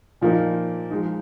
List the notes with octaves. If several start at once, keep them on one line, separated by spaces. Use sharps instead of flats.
A#2 F3 A#3 D#4
F3 G#3 D#4